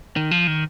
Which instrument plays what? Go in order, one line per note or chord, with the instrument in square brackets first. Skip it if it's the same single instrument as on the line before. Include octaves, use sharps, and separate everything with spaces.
[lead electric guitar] D#3
F3
D#3